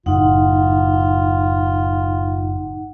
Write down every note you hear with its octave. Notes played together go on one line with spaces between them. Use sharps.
F#1 A2 D#4 F4 F#5